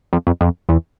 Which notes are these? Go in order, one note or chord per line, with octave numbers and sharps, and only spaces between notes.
F2
F2
F2
E2